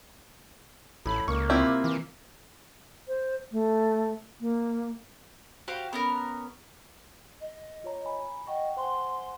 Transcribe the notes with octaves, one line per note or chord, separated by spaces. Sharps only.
A1 A2 B5
C#2 A#3 C#6
C3 C4 E4 F4 G4
E3
C5
A3
A#3
F#4 G4 C5 F5
B3 C#4 A#4
D#5
F4 C#5 A#5
G#5 B5
D#5 F#5 G5 C#6
C5 F#5 G#5 C6